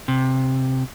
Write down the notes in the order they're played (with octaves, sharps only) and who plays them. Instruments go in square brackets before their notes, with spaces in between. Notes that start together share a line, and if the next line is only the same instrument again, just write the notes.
[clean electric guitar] C3